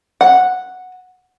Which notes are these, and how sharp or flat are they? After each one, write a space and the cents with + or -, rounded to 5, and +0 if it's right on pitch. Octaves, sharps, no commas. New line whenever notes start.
F#5 -5